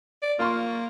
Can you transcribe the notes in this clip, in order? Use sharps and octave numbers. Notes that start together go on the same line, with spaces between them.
D5
A#3 F4 C6 C#6